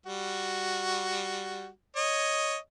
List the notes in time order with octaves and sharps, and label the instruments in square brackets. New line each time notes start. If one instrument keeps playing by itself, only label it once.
[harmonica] G3 F#4
C#5 D#5